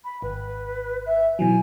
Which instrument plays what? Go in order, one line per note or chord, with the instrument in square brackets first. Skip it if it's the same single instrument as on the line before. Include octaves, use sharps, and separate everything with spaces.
[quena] B5
[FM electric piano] G#1 [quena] B4
[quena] E5
[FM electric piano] B2 E3 F#3 [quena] G#5